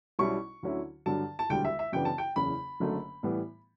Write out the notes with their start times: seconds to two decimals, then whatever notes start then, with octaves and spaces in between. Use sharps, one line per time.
0.19 B1 B2 G3 C#4 E4 C#6
0.63 D2 D3 F#3 C#4 E4
1.06 G2 D3 F#3 A5
1.39 A5
1.49 E1 D2 D3 G3 G5
1.65 E5
1.79 E5
1.92 F#2 C#3 E3 B3 D4 G5
2.05 A5
2.18 G5
2.36 F#1 E2 C#3 B5
2.80 F#1 F#2 D3 A3
3.23 A2 E3 G3 B3